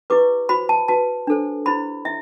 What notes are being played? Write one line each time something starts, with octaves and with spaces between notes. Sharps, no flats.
E4 G4 B4 D6
F#4 C5 B5
A5
F#4 B4 A5
D4 A4 C5
E4 G4 C5 B5
E4 E5